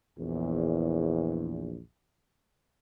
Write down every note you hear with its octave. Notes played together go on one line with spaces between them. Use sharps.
A#1 E2